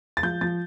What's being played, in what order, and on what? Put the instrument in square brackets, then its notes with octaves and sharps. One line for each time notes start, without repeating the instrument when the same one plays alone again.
[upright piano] A6
F3 G6
F3 A6